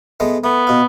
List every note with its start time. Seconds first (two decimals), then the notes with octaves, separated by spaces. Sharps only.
0.20 G#3 A3 B3
0.44 A3 B3
0.67 B2 F5